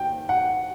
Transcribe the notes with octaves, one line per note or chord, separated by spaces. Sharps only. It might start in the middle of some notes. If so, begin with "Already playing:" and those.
Already playing: G5
F#5